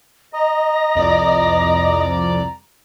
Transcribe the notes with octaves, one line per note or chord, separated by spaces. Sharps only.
D#5 A#5
C2 F2 D5